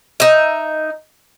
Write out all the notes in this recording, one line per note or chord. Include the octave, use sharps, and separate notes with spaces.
D#4 E5